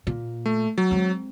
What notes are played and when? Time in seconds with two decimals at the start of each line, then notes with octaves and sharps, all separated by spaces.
0.07 A#2
0.46 A3
0.78 F#3
0.91 G#3 C4